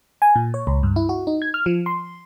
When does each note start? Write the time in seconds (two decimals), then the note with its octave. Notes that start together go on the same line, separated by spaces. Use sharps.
0.22 G#5
0.35 A#2
0.54 C#5
0.67 C#2
0.83 G2
0.96 E4
1.09 F#4
1.27 D#4
1.42 G#6
1.54 F6
1.66 F3
1.86 C6